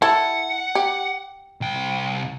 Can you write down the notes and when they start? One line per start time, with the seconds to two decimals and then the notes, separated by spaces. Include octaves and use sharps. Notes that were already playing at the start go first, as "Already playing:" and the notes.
0.02 E4 A4 F#5
0.75 G4
1.61 C2 G5